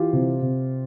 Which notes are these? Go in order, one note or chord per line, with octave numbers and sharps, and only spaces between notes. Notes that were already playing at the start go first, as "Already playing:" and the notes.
Already playing: E3 F4 G4
C3
C3